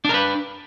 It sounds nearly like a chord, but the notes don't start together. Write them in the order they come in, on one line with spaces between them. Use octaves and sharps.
D4 A#4 B4